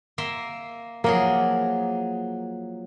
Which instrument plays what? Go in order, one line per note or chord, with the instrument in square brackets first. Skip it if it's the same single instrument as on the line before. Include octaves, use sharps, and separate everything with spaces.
[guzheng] A#3 E5 C6
[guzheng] F3 F#3 G#4 [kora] A#3